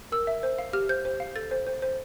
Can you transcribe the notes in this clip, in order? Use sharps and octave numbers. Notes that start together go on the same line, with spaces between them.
A#4 E6
E5
C5
F5
G4 F6
C5 G6
C5
F5
A4 A6
C5
C5
C5